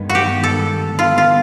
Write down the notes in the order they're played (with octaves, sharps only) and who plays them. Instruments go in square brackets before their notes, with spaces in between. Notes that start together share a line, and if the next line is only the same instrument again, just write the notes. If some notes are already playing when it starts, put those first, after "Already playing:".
Already playing: [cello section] G2 D#3 G#3 B3
[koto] F#4
G4
A4
[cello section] D3 G3 B3 [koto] F4
[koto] F4